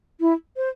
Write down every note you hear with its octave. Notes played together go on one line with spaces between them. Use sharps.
E4
C5